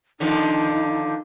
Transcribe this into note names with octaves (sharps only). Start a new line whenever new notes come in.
D3 D#3 F3 D#4